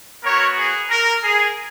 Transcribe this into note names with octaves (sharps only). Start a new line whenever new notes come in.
B3 F#4 A#4 C#5
G#4
A#4
G#4